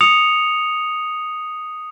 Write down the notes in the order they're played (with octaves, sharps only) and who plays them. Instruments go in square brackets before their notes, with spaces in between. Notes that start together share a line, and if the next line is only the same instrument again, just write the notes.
[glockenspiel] D#6 C#7 F7